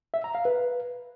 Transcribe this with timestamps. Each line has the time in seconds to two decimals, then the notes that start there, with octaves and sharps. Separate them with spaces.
0.14 E5
0.24 A#5
0.35 F5
0.45 B4